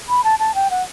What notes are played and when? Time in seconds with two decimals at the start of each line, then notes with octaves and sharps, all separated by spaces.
0.09 B5
0.24 A5
0.39 A5
0.55 G5
0.70 F#5